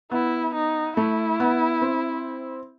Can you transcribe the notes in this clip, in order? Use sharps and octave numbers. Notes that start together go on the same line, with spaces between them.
B3 E4
D#4
A3 E4
B3
C4